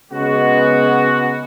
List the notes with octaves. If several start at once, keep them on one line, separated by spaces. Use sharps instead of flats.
C#3 G#3 B3 F#4